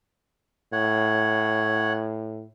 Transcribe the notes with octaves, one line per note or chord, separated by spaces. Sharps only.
A2 C#5 F#5